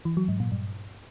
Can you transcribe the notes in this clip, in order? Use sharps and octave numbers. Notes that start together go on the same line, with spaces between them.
E3
F#3
G#2
A#2
G2